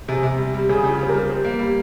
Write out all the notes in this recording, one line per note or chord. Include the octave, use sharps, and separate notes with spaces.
C3 G#4
C3
G3
G3
C#3 G#4
C#3 G4
F4
G3 C5
A#4
G3
G3 C5
A#3
G3